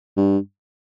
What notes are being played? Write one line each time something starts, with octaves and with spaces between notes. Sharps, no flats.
G2